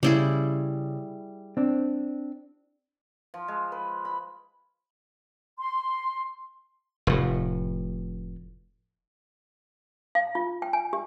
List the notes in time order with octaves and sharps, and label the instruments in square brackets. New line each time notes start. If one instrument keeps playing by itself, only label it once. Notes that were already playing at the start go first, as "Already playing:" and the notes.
[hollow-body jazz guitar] C#3 [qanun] G3 E4 G#4
[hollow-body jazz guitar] C4 D4
[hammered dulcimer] F3
G#3
B4
B5
[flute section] C6
[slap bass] F1 A2
[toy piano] F5
F4
G5
G#5
G4